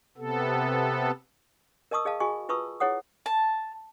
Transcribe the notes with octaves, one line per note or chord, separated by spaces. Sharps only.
C3 B3 A4
A#4 D#5 A5 C#6 D#6 E6
G#4 D#5 F5 A5
F#4 G#4 D#5 G#5 C#6
F4 B4 A5 C#6 D#6 E6
E4 G#4 C#5 F#5 D#6
A5